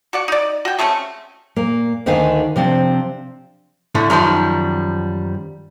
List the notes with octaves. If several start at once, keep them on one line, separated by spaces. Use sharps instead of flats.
F#4 D5 F#5
D#4 D5
F#4 G5
G#3 A3 C4 C#4
A#2 A#3
D2 D3 D#3 D#4 F5 G#5
C3 F3 C4 D4
A2 D3 E4
F#2 D#3 F3 G3